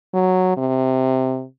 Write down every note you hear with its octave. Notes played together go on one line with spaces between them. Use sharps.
F#3
C3